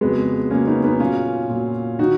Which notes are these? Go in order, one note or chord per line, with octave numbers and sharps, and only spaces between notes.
F2 C#3 F#3 G#3 B3
F2 C#3 F#3 A#3 C#4
B3 D#4
B3 D#4
A#2 F#3 C#4 F4
A#2 F#3
D#3 D#4 F#4